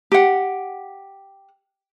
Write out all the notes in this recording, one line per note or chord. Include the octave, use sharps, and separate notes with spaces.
G4 F#5